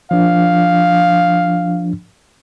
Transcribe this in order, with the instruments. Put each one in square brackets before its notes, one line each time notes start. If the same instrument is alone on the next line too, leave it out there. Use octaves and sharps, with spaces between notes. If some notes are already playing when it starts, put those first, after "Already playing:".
[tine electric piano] F3 D4 [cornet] F5